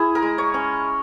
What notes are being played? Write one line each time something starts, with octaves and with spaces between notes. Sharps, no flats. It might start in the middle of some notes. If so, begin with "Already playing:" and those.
Already playing: E4 G#4
A#4
G#3
C#5
C#4